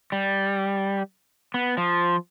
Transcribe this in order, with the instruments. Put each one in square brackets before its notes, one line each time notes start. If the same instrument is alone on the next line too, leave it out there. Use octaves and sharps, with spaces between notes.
[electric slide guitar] G3
B3
F3